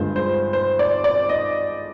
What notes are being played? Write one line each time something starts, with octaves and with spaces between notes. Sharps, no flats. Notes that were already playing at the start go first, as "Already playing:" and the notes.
Already playing: G2 D3 F3 G#3 C5
C5
C5
D5
D5
D#5